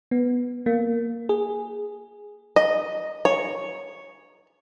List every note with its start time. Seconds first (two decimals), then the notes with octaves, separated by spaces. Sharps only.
0.11 B3
0.66 A#3
1.29 G#4
2.56 D#5
3.25 C#5